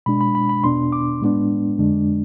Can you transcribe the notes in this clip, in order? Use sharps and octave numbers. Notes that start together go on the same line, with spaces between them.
B2 G#3 D4 B5
B5
B5
B5
E2 B2 B3 D4 C6
D6
A2 G#3 B3 D4
F2 D3 G#3 D4